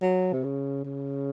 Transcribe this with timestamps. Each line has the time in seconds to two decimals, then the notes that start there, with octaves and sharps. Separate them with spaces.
0.02 F#3
0.33 C3
0.44 C#3
0.84 C#3